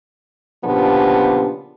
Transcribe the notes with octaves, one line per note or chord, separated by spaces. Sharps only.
A#2 C#3 F3 B3 D4 G4